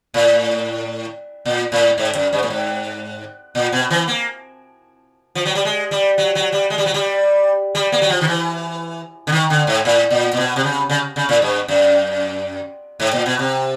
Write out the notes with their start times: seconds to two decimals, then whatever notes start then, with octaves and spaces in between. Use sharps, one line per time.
0.14 A2
1.45 A#2
1.72 A2
1.98 G#2
2.15 F#2
2.33 G2
2.43 A2
2.50 G#2
3.55 A#2
3.73 B2
3.90 E3
4.08 A#3
5.35 F3
5.45 F#3
5.55 G3
5.65 G#3
5.91 G3
6.18 F#3
6.35 F#3
6.52 G3
6.70 G#3
6.78 G3
6.86 F#3
6.94 G3
7.75 G3
7.92 A#3
8.02 F#3
8.10 F3
8.21 D#3
8.27 E3
9.27 D3
9.32 D#3
9.50 D3
9.67 G#2
9.85 A2
10.10 A#2
10.33 A#2
10.37 B2
10.56 C3
10.64 C#3
10.90 C#3
11.16 C#3
11.29 A2
11.42 G2
11.68 F#2
13.00 G#2
13.13 A#2
13.26 B2
13.39 C3